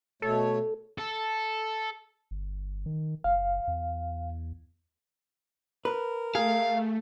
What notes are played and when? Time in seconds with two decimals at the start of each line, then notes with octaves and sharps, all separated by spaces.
0.22 B2 A3 A4 C#5
0.98 A4
2.31 G1
2.86 D#3
3.24 F#1 F5
3.67 E2
5.85 A#4 B4
6.35 A3 G#4 F5